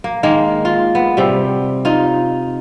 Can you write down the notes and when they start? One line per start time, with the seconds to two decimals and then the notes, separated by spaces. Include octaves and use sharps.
0.04 A#3
0.23 D#3 G#3 A#3
0.65 F4
0.95 B3
1.17 C3 G3
1.85 D#4 F4